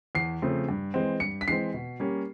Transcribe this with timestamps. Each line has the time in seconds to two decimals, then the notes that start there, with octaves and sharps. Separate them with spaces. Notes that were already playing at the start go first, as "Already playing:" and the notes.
0.15 E2 C7
0.42 C#3 F3 A3 C4
0.69 G2
0.94 E3 G#3 C4
1.20 G2 C#7
1.41 B6
1.48 E3 G#3 C4 C7
1.74 B2
2.00 G3 A#3 C#4